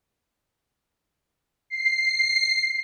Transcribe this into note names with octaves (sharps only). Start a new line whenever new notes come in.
C7